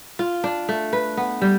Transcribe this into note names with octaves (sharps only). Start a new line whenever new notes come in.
F4
D4
A3
B4
B3
G3